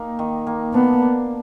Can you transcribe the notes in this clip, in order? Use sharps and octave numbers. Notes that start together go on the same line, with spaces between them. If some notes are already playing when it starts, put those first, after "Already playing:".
Already playing: A#3 D#4 G4
D#3
A#3
B3 D4
A#3